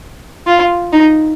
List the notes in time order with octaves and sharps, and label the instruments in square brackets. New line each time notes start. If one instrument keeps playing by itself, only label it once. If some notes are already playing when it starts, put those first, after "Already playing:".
[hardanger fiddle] F4
D#4